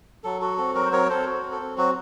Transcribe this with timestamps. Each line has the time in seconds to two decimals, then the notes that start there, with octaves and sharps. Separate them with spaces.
0.24 F#3 A4
0.41 F#4 A4
0.58 C4 A4
0.75 F#3 F#4 A#4
0.86 C5
0.92 C4 A#4 C#5
1.09 C4 A4 C5
1.27 F#4
1.44 C4
1.52 A4
1.60 C4
1.77 F#3 F#4